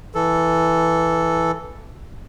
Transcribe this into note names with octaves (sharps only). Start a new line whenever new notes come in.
E3 A4